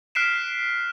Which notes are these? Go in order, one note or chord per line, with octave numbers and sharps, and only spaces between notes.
F6 F#6 B6 C7 D7 E7